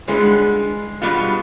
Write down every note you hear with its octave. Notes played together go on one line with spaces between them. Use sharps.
D3 G3 G#3 B3 F4
B2 G3 B3 F4